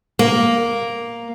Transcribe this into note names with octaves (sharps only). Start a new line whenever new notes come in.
A#3